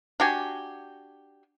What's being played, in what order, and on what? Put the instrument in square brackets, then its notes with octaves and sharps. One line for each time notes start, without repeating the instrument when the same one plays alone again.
[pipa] D4 F#4 G4 G#5